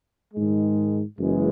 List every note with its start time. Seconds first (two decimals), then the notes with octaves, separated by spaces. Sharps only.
0.34 G#2 D#3 G#3
1.17 F#1 F#2 E3 G#3